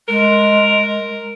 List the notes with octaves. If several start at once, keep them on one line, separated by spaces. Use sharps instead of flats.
G#3 A#4